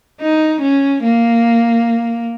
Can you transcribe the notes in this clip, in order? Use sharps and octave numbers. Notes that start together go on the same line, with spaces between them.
D#4
C#4
A#3